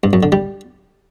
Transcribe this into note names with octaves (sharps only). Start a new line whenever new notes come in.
G2
F#2
D3
G3